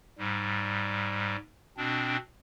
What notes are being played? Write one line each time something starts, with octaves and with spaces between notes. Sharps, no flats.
G#2 G3
B2 C4 D4